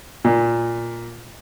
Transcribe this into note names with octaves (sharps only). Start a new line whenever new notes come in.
A#2